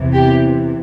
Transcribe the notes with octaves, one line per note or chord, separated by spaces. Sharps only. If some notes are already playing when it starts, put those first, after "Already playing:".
Already playing: E2 C3 E3
G4